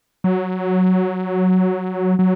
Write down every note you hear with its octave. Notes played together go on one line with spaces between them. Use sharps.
F#3
F#3